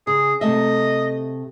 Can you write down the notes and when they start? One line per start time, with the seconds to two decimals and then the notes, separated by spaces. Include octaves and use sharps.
0.07 C#3 G#4
0.41 C3 A3 D#5 E5